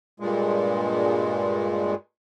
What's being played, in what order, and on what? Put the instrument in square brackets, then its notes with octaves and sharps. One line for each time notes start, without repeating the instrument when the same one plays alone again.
[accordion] G2 A#2 G#3